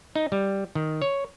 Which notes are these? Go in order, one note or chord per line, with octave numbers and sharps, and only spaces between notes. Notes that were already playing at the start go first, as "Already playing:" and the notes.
D#4
G3
D#3
C#5